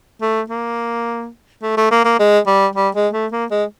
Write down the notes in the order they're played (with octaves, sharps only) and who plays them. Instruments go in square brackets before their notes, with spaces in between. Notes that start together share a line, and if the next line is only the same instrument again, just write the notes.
[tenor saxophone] A3
A#3
A3
A3
A#3
A#3
G#3
G3
G3
G#3
A3
A#3
G#3